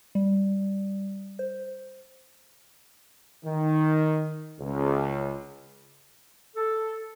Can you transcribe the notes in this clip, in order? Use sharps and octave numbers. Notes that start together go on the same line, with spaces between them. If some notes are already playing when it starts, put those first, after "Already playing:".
G3
C5
D#3
C#2
A4